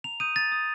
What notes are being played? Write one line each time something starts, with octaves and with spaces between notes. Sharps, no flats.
A#5 F7
D#6 G6 D#7
A#5 A6
D#6 G6